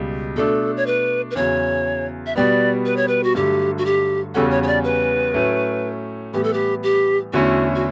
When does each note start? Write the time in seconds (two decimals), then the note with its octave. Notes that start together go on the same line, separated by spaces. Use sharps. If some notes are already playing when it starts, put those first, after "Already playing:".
Already playing: C#2 B2 G3
0.36 B2 A3 D4 A4
0.77 C#5
0.87 B4
1.31 B4
1.35 E2 C#3 F#3 C#5
2.26 E5
2.36 B2 G3 B3 D5
2.85 B4
2.97 C#5
3.08 B4
3.23 F#4
3.35 G2 D3 F#3 A3 G4
3.78 F#4
3.85 G4
4.34 E2 C#3 G3 C#4 F#4 A4
4.51 C#5
4.63 C#5
4.67 D5
4.84 B4
5.34 A2 F#3 A3 C#4
6.33 A2 E3 G3 B3 G4
6.44 A4
6.53 G4
6.83 G4
7.33 E2 D3 A3 C#4 E4 F#4
7.75 F#4